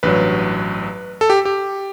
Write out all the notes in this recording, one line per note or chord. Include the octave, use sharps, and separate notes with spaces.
A1 G2 F#3 B4
A4
G4
G4